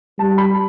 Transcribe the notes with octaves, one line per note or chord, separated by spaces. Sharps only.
G3 A5
B5